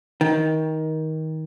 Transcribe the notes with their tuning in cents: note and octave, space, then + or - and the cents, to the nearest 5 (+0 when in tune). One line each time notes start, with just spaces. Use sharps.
D#3 +20